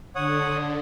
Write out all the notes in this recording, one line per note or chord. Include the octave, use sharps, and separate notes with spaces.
D3 C#5 F#5 D#6